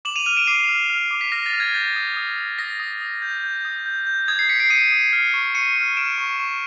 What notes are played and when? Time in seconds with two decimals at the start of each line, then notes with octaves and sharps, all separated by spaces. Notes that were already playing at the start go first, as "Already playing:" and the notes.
0.05 D6 E7 F#7
0.16 D#7 F7
0.26 F6 D#7 F7
0.37 D7 E7
0.47 D6 C7
0.69 F6
0.90 F6
1.11 D6
1.21 B6
1.32 F6 A#6
1.46 A6
1.53 F6
1.60 G#6
1.74 G6 A6
1.96 D#6
2.17 D#6
2.38 D#6
2.59 D#6 A#6
2.80 D#6
3.01 D#6
3.22 G6
3.44 G6
3.65 D#6
3.86 G6
4.07 G6
4.28 D#6 G#6
4.39 C7
4.49 G6 B6 C#7
4.60 C7 D7
4.70 D#6 C#7 D#7
4.92 D#6
5.13 F6
5.34 C#6
5.55 C#6 C#7 D#7
5.76 F6
5.97 F6 D7 E7
6.18 C#6
6.39 C#6